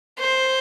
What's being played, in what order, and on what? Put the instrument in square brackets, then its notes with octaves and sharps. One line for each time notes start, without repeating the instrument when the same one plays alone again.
[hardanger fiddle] C5